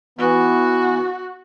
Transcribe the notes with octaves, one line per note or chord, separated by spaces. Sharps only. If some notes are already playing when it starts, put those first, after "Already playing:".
E3 B3 F#4